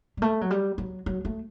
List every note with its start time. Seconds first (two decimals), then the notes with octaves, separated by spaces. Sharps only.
0.17 G3
0.22 A3
0.41 F#3
0.51 G3
0.78 F#3
1.06 F#3
1.25 A3